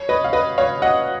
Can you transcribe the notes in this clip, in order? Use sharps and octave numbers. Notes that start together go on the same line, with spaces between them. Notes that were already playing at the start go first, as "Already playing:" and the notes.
Already playing: C#5
B4 D#5
F5
B4 D#5
C#5 F5
D#5 F#5